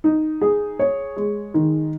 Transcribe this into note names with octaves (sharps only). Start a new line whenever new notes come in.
D#4
G#4
C#5
G#3
D#3